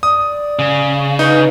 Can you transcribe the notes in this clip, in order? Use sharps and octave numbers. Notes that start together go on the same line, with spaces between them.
D5 D#6
C#3
D#4 B4